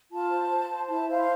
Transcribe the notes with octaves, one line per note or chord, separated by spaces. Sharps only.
F4 A5
C5
C5
C5
E4 A5
C5 F5